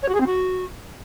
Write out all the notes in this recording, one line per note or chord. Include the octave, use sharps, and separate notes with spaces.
C#5
F#4
G#4
C4
F#4